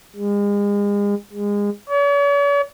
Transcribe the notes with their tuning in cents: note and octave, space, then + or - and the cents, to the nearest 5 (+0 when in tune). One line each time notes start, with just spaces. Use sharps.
G#3 -35
G#3 -25
C#5 +45